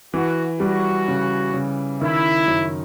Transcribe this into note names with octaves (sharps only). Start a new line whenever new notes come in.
E3 F#4
G3 F#4
C#3
C#3
D#3 E4
F#2